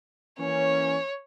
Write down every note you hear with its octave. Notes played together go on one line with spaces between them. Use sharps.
E3 A#3 C#4 C#5